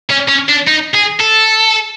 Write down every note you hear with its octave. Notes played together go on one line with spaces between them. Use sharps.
C#4
C#4
D4
D#4
G#4
A4